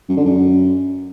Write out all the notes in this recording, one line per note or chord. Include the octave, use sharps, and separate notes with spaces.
F#2
D3
F#2